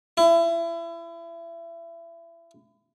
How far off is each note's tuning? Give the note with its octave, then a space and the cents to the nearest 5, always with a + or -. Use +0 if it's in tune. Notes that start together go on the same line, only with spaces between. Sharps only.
E4 +30